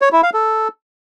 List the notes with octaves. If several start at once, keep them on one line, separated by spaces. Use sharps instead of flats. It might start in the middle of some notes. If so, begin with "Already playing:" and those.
C#5
E4
F5
A4